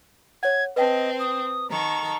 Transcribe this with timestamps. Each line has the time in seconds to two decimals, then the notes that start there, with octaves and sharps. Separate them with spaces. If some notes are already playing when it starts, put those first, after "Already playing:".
0.43 C#5 F#5 G#6
0.76 C4 B4 D#5 G5 A5
1.20 D#6
1.70 D#3 A4 A#5 C#6